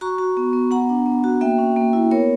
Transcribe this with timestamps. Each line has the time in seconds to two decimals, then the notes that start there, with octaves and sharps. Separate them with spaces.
0.01 F#4 A#5 C#6
0.18 F#4
0.37 B3
0.53 B3
0.71 B3 F#5 A#5
0.89 D4
1.06 B3
1.24 F#4
1.41 A#3 E5 G5
1.58 C#4
1.76 A#3
1.93 E4
2.11 B3 A#4 C#5